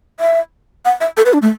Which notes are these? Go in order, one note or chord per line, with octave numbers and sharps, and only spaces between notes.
E5
F#5
E5
A4
B4
D4
A3